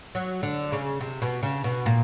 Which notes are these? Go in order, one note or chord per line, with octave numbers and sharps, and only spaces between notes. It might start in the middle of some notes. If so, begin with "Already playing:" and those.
F#3
D3
C#3
C3
B2
C#3
B2
A#2